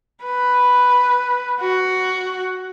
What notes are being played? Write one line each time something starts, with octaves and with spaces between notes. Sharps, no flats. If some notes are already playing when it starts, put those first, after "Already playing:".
B4
F#4